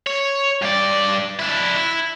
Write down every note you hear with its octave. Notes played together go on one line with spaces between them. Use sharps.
C#5
G2 D5
D4 E4
E4